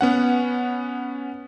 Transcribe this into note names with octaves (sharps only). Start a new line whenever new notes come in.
B3 C#4 F#5